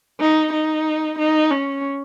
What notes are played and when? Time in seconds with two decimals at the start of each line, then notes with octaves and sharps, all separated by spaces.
0.21 D#4
0.53 D#4
1.18 D#4
1.51 C#4